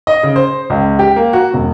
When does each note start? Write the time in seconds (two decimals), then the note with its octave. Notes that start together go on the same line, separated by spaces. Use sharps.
0.07 D#5
0.23 C#3
0.36 C5
0.70 C#2
0.99 G4
1.16 A#3
1.33 F#4
1.53 E1